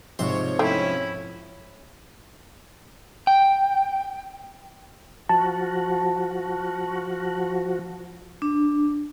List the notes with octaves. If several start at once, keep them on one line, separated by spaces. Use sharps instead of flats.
G#2 C3 F3 C#5 C6
A3 C4 C#4 D#4 E4
G5
F3 F#4 A5
D4